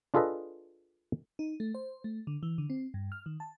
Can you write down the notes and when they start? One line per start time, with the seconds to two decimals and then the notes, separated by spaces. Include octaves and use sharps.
0.14 D4 F4 G#4 A4 B4 D#5
1.39 D#4
1.60 A3
1.75 C5
2.04 A3
2.27 D3
2.43 E3
2.58 D3
2.70 C4
2.94 G2
3.12 F6
3.26 D#3
3.40 A5